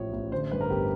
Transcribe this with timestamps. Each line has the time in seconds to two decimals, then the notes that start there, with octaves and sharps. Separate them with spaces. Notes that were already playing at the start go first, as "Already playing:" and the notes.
Already playing: A1 A2 F3 C#5
0.13 A1
0.32 D3 C5
0.51 G2 B4
0.61 A#4
0.70 G1 G4